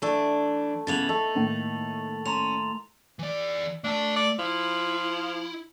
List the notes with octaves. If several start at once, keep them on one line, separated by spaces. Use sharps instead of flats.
E3 A3 D4 A5
C#3 E3 B3 A6 F7 F#7
A3 D#4
A2 D#3 A#3
C#4 A#5 C6 F7
E3 D5
A3 D4 A5
D5
F3 E4